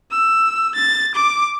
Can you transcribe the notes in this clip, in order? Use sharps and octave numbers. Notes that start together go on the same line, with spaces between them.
E6
A6
D6